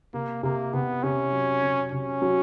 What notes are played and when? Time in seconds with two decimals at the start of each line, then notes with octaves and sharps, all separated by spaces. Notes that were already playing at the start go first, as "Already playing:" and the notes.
0.14 C3 A#3
0.43 C3 A#3
0.73 C3 B3
1.03 C3 C#4
1.33 F#3
1.63 C3
1.92 C3 C#4
2.22 F#3